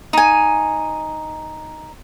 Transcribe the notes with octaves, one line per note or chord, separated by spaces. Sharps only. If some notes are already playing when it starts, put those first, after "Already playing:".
D#4 G#5